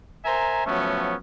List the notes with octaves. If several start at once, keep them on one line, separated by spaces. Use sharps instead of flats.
A#4 C5 E5 G#5 A#5
F3 F#3 A3 B3 C#4